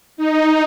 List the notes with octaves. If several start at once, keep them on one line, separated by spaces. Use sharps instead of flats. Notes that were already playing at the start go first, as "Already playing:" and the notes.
D#4